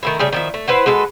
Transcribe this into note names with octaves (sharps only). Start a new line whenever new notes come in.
D#3 A3 E4
C#3 G3 A3 G#4
D#3 F3 E4
A3
E4 B4 C5 F#5
G#3 F#4 A4 B4